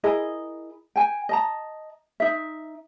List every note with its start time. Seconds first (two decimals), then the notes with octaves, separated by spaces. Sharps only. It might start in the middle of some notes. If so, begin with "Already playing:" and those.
0.04 E4 G#4 A#4 D#5
0.96 G5 G#5
1.29 D#5 A5 A#5
2.20 D#4 E5